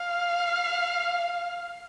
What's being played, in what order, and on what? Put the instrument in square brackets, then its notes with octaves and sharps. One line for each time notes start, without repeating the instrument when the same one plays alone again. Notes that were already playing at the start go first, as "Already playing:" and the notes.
Already playing: [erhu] F5